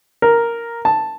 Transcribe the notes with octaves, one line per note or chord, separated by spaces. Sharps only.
A#4
A5